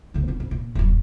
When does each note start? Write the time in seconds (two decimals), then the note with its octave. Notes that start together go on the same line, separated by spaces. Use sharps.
0.14 D2 D3
0.28 C4 D4
0.40 G#2
0.51 A#2
0.75 D#1 F#2